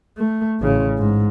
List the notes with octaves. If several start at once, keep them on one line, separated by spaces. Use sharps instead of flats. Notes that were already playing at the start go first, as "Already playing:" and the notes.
A3
A1 C#3
G#2